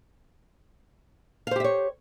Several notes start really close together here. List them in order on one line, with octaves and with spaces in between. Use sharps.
F5 C5 G4 E5 C#5